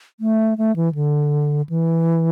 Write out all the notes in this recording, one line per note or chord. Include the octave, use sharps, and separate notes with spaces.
A3
A3
E3
D3
E3